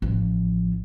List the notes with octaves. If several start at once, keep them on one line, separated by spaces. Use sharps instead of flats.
A1 F3